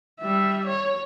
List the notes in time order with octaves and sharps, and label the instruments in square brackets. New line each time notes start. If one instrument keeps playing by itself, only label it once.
[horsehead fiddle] G3 E5
C#5